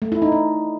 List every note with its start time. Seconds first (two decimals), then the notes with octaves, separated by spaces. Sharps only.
0.02 A3
0.12 E4
0.22 D#4
0.32 D4